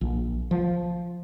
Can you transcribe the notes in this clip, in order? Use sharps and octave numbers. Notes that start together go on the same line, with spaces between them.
A#1
F3